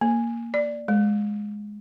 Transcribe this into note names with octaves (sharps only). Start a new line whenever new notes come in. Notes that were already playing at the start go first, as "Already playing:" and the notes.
A#3
D5
G#3